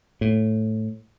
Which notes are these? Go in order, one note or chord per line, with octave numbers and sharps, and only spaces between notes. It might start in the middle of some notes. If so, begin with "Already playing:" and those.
A2